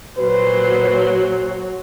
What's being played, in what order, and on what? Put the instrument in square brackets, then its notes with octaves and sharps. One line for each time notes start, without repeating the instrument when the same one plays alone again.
[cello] A#2 C5 [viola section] F#3 [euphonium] B4